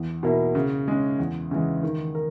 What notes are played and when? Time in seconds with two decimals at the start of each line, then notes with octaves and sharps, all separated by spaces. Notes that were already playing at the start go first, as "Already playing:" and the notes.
Already playing: E2
0.23 B2 A#3 E4 A#4
0.55 C#3
0.88 G#3 C#4
1.19 E2
1.51 C#3 E3 G#3
1.83 D#3
2.15 A#4